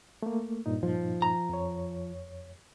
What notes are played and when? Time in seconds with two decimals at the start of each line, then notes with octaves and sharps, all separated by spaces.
0.23 A3 A#3
0.66 G2 A#2 D#4
0.83 F3
1.22 A#5
1.49 F2 C#5